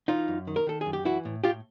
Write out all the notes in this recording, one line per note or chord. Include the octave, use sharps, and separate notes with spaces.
E3 D#4 F4
F#2
D#3
A#4
D#3 A4
F#2 G#4
G4
E3 E4 F#4
A2
A2 F4 G4